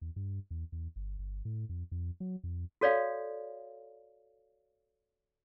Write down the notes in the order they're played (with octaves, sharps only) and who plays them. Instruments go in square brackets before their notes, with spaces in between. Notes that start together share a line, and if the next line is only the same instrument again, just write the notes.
[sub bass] E2
G2
E2
E2
G1
G1
A2
F2
F2
F#3
F2
[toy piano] F#4 A4 C#5 D5 F5